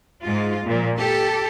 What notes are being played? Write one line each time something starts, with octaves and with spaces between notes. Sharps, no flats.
G#2 G#3 F4
A#2 F3
G4 A4